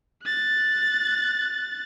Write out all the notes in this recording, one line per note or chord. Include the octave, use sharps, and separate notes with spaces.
F#6 A6